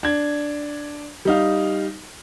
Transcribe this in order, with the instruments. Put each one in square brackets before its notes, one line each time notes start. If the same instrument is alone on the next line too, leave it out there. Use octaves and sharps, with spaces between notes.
[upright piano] D4 G#6
G3 D#4 F5